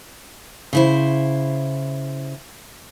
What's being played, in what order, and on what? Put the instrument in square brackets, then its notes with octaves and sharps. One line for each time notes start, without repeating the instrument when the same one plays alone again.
[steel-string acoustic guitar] C#3 E4 C5